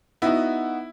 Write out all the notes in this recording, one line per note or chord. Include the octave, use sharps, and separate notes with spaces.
B3 D#4 E4 F#4